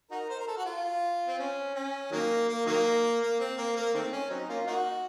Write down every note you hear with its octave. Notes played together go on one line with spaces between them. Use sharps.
D#4 F#4 A#4
C5
A#4
A4
F#4
F4
C4
C#4
C#4
D#3 F#3 A#3
A#3
D#3 F#3 A#3
A#3
C4
A#3
A#3
D#3 A3 C4
C#4
F#3 C4 D#4
A#3 C#4 F4
A#3 D#4 F#4